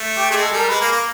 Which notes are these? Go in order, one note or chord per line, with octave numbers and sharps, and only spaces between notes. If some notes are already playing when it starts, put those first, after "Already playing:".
Already playing: A3
G4
A3 G#4
G#3
A4
G3 A#4
G#3 B4
A#3
A#3